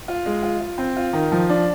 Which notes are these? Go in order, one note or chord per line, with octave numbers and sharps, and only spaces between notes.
F4
G#3
F4
F4
C4
F4
D#3
F3
D4